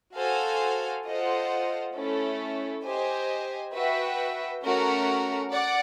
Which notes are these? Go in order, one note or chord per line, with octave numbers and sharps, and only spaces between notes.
F#4 A4 C5 F5 G#5
F4 A4 C5 D#5 F#5
A3 C#4 E4 A4
G4 C5 D#5 G#5
F#4 B4 E5 G5
A3 C#4 F#4 A#4
D5 F#5